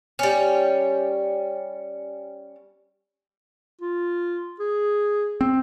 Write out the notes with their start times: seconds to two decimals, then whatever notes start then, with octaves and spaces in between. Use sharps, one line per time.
0.19 G3 C#4
3.81 F4
4.60 G#4
5.41 C4